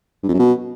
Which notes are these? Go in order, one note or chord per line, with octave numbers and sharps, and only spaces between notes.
G2
F2
F#2
B2